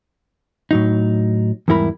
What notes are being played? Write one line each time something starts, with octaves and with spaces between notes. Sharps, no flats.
A2 F#3 D#4
E2 G#2 G3 E4 A#4 B5